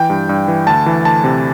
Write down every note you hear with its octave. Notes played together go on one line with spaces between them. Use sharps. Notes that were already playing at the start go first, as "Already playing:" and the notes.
Already playing: E3 G5
G2
G2
E3
D2 A5
E3
D2 A5
C3